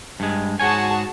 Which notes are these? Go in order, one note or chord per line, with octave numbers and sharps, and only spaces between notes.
G2 G#3
G#2 F#4 G#4 C#5 G#5 A5